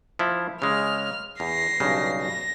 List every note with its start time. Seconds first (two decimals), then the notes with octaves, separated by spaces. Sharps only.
0.19 F3 E4
0.62 C#3 G#3 F6
1.40 E2 A#6 C7
1.80 B1 G2 C#3
2.21 A#6